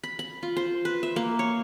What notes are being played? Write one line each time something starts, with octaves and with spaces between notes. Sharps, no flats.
B5
B5
F4
C5
B4
E5
A#3
C#5